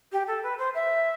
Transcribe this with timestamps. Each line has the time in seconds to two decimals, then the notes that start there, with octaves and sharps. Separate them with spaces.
0.12 G4
0.27 A4
0.43 B4
0.58 C5
0.74 E5